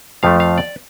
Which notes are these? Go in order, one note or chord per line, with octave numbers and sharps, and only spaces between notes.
F2 F3 A3 F5
F5
D5